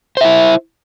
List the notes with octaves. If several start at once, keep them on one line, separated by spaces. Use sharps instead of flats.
E4 C5 E5